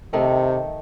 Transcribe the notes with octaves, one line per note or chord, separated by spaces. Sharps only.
C3 D#3 A3 D#4